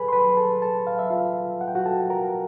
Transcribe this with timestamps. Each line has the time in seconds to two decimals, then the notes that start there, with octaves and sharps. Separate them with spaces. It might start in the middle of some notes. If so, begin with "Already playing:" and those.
Already playing: A2 F#3 G#4 A4 B4 G#5 B5
0.08 C6
0.12 A2 F#3 B4 B5
0.37 A4 A5
0.62 A4 A5
0.86 A2 F#3 F5
0.99 E5
1.10 F4 F5
1.61 F#3 F#5
1.65 A2 G5
1.75 F#4 F#5
1.86 A4 A5
2.10 A#4 A#5